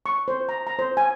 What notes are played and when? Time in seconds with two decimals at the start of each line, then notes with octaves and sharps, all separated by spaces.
0.06 C#6
0.28 C5
0.49 A#5
0.67 A#5
0.79 C5
0.97 G#5